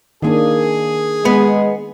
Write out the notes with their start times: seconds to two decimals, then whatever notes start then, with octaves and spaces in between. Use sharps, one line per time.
0.22 D#3 A#3 D4 G#4
1.25 G#3 B3